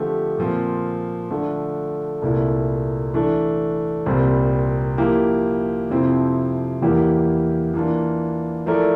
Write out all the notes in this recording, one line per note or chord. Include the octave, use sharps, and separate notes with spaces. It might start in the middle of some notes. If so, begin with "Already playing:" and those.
Already playing: D3 F3 A3 C4 G4
A#2 F3 C4
D3 F3 A3 D4
C2 A#2 A3 E4
E3 A3 D4
C2 A#2 G3 C4
F3 A#3 E4 G4
F2 C3 F3 C4 E4
E2 E3 A#3 E4 G4
E3 A#3 D4 F4
F3 A3 E4 A#4 D5